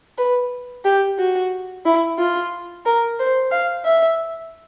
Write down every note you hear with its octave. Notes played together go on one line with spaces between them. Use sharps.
B4
G4
F#4
E4
F4
A#4
C5
F5
E5